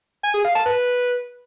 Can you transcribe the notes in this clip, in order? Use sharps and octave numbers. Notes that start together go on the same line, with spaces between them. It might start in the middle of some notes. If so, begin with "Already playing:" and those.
G#5
G#4
F5
A5
B4